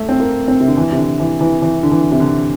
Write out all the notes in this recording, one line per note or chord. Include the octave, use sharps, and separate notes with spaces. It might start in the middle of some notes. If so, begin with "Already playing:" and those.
Already playing: A3
C4
A#3
C4
C3
D3
E3
C3
D3
E3
E3
E3
D3
E3
C3
D3